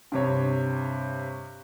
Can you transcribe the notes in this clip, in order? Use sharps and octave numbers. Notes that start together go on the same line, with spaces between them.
G2 C3 C#5